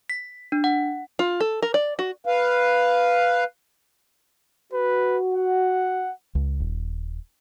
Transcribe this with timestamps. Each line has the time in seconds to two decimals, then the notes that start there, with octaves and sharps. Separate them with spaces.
0.10 B6
0.52 D4
0.64 F#5
1.19 F4
1.40 A4
1.62 A#4
1.74 D5
1.99 F#4
2.25 B4 F5
4.73 F#4 B4
5.34 F#5
6.35 C#2
6.60 D#1